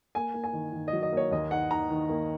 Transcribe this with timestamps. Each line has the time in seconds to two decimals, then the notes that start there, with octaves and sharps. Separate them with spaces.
0.15 A#3 G#5
0.34 A#3
0.44 G#5
0.53 D#3
0.73 D#3
0.88 D#5
0.93 F#3
1.03 D#5
1.12 A#3
1.17 C#5
1.31 D#2 D#5
1.51 D#4 F#5
1.71 D#3 A#5
1.91 D#3
2.09 A#3